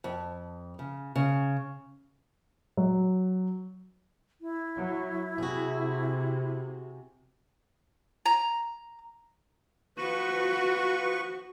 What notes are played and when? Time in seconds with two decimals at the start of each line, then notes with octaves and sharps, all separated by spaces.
0.04 F2
0.79 C#3
1.15 C#3
2.77 F#3
4.41 E4
4.75 F#3
5.38 C3 F#4 G#4
8.26 A#5
9.98 F3 F#4 B4 C#6